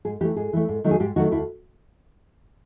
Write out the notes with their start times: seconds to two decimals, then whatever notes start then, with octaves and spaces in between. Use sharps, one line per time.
0.05 G#2 G#4
0.21 E3 G4
0.24 A3
0.36 G#2 G#4
0.53 E3 A3
0.68 G#2
0.84 D#3 F#3 A3
0.91 G#4
1.00 G#2 G4
1.16 D#3 F#3 A3 F#4
1.32 D2 E4